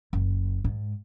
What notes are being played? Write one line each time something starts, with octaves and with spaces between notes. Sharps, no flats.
F#1
G#2